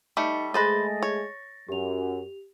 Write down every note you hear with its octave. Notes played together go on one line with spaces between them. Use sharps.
G3 A3 D#4 D#5 C#7
G#3 A3 G#4 B4 C5 D#5 A6 A#6
C#5
F#2 G4 F7